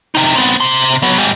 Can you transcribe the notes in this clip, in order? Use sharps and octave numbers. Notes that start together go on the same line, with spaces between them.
C3 D#4
B3 C4
C3 C6
F#3 B3
G#2 G3